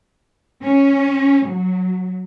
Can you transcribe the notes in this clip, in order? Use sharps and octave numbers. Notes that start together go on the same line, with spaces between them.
C#4
F#3